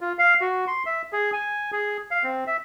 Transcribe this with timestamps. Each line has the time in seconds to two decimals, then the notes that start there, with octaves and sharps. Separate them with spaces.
0.01 F4
0.19 F5
0.41 F#4
0.67 C6
0.86 E5
1.12 G#4
1.33 G#5
1.72 G#4
2.11 F5
2.23 C4
2.47 E5